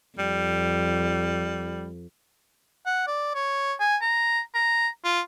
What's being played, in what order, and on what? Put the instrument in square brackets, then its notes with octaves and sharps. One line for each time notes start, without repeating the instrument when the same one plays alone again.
[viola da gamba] F2 [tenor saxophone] G3
[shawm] F#5
D5
C#5
G#5
A#5
A#5
F4